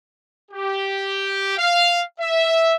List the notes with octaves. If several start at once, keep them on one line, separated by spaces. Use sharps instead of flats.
G4
F5
E5